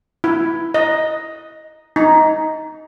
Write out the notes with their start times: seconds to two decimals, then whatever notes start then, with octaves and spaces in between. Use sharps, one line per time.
0.24 E4
0.74 D#5
1.96 D#4